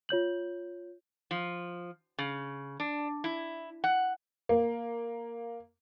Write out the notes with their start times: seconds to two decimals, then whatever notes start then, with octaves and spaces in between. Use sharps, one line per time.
0.09 F4 C#5 G6 F#7
1.31 F3
2.18 C#3
2.80 D4
3.24 E4
3.84 F#5
4.49 A#3